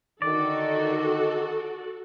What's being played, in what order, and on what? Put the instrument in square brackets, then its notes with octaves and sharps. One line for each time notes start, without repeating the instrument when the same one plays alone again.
[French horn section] D3 D#3 [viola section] F#4 A4 [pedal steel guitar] D5